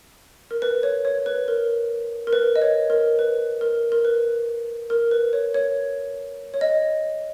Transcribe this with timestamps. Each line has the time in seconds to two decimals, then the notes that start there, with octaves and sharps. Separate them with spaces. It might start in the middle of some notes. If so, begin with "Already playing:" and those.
0.51 A#4
0.62 B4
0.83 C#5
1.05 C#5
1.26 B4
1.48 A#4
2.27 A#4
2.33 B4
2.56 D#5
2.62 C#5
2.90 A#4
3.19 B4
3.61 A#4
3.92 A#4
4.05 B4
4.90 A#4
5.11 B4
5.33 C#5
5.54 C#5
6.54 C#5
6.61 D#5